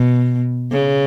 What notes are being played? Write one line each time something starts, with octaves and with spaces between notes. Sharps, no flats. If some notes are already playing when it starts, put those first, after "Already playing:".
Already playing: B2
C#3